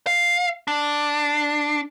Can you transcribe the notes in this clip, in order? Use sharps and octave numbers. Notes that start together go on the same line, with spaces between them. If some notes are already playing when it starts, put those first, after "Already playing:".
F5
D4